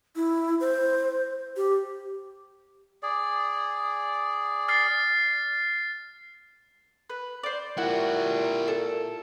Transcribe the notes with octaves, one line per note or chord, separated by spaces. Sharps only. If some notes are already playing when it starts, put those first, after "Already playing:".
E4
C5
G4
G#4 D5
F6 A6 C7
B4
C5 D5
A#2 E4 F#4 G4
A4